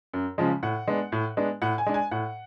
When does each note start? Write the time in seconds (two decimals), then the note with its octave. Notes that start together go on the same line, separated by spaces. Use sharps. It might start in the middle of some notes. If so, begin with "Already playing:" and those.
0.13 F#2
0.38 C#3 F3 G#3
0.63 A2 F#5
0.88 G#3 B3 D4
1.12 A2
1.37 G#3 B3 D4
1.62 A2 F#5
1.78 G#5
1.86 G#3 D4
1.94 G#5
2.11 A2 F#5